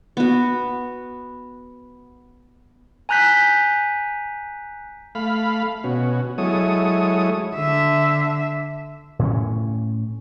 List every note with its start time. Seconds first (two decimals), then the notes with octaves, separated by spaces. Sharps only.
0.17 B3 F#4
3.09 G#5 A#5 F#6 G6 B6
5.15 A3 F5 B5
5.84 B2 C#4 F#4
6.38 F#3 G#3 E4 A4 C#5 D#6
7.55 D3 E5
9.19 A2 C4 C#4